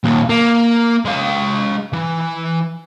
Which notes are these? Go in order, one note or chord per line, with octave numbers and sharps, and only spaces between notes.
D#2 A#2
A#3
G#3 F5
E3